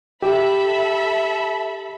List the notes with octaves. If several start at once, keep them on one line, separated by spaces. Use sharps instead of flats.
G4 A4 E5 B5